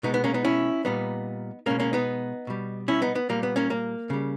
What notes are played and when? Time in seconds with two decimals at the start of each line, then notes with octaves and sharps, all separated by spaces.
0.03 B2 G#3 B3 D#4
0.14 B3
0.24 A#3 C#4
0.34 B3 D#4
0.45 C#4 E4
0.85 A#2 G3 B3 D#4
1.66 B2 G#3 A#3 C#4
1.80 A#3 C#4
1.93 B3 D#4
2.47 B2 G3
2.88 C#4 E4
3.02 B3 D#4
3.15 B3
3.29 A#2 G3 A#3
3.43 B3
3.56 A#3 C#4
3.70 A#3
4.10 C#3 G3